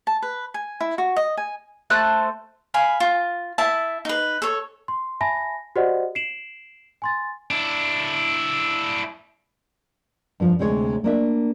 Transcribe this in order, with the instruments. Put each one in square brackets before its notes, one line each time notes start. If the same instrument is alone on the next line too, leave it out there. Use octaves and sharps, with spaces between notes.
[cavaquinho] A5
B4
G#5
E4
F#4
D#5
G#5
[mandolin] A3 A4 C5 F#6
[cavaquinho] F5 G#5 B5
F4
E4 E5 A5
D#4 B4
A4 C#5
[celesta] C6
E5 G#5 A5 B5 A#6
F#4 G4 C5 D5 D#5 F#5
C7 D7 E7 F#7
G#5 C6 A6
[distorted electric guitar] D4 E4
[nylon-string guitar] G2 F3
D2 C3 G#3 C#5
A#3 D4 E5